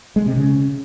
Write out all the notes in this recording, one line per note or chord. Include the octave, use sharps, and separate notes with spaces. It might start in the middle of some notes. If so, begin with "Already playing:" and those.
G#3
C3
C#3